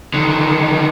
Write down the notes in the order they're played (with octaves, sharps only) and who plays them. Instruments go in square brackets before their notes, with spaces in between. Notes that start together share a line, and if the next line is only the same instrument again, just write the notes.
[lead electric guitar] D3 D#3